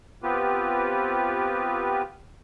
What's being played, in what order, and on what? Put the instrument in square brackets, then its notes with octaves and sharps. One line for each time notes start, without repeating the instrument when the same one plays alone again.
[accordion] B3 C4 F4 G4 B4